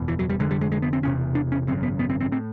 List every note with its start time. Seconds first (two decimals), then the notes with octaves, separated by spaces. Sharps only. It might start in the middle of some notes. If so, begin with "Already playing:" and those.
Already playing: F#1 E2 B2
0.08 E3
0.19 F#3
0.29 G3
0.39 F1 F2 D3 G#3
0.51 G3
0.61 G#3
0.72 G#3
0.82 B3
0.93 C4
1.03 E1 E2 C3 C#4
1.35 D4
1.52 C#4
1.67 G#1 F#2 C#3 C4
1.83 B3
1.99 B3
2.10 C4
2.20 C4
2.32 A2 C4